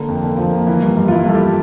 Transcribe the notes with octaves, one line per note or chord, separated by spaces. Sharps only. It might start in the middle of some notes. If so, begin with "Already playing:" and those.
Already playing: D3 A#3
F2
D3
F3
A#3
E3
G2
G2
F4
G2 E4
G2 A4
G4